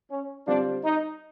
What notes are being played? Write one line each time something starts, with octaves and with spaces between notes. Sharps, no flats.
C#4
D3 G3 C4 D4 F4
D#4